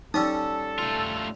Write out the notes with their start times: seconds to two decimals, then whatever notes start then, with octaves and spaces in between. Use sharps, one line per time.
0.14 G3 C#4 D#4 A4 D#6
0.79 A3 F4